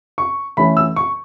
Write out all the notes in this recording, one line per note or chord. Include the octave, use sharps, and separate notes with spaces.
C#6
E3 A3 C#4 B5
E6
C#6